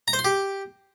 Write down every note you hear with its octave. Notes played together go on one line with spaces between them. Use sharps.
A#5
C5
C6
G4